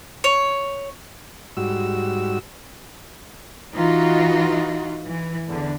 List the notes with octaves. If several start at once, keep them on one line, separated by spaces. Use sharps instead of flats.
C#5
G#2 G3 F#4 E6
E3 D#4 F4 F#4
E3
E2 D3